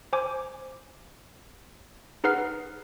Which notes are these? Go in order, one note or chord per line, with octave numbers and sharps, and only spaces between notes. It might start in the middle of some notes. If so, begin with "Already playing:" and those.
C5 G#5 D6
D#4 G#4 B4 F#5 F6 C7